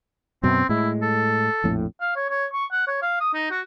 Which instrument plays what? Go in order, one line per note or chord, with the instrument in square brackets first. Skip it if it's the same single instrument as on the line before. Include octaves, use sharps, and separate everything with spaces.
[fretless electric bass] F#2 B2 [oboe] C4
[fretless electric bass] A2 G#3 [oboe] E4
[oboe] A4
[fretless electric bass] A#1 F2 A2
[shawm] F5
C#5
C#5
C#6
F#5
C#5
F5
D#6
D#4
F#4